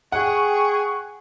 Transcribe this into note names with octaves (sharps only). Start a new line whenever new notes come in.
G#4 F#5 G5 C#6